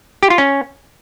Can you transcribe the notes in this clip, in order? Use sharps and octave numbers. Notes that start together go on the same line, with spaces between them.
G4
F4
C#4